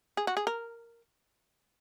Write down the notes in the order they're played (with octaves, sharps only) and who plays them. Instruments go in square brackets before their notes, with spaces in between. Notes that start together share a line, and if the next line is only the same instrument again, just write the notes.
[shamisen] G#4
F#4
G#4
A#4